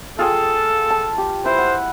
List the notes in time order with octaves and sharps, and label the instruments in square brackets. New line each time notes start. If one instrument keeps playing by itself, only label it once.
[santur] F4 G#4 G5 [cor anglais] A4
[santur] A5
G4
[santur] E4 B4 [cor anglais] C5
[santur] F#5